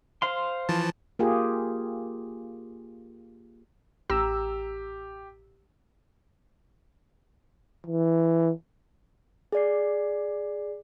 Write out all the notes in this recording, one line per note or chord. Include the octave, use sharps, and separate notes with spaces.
C5 F5 C6
E3 F3 A5
A#3 F4 G4 G#4
A1 G4 A#5 E6
E3
G#4 D5 C7